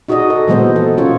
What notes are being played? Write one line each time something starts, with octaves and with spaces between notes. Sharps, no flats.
D#4 F#4 G#4 D5 D#5
A4
A#2 E3 F#3 G#3 B3 C5
A4
B2 C#4 F4 C#5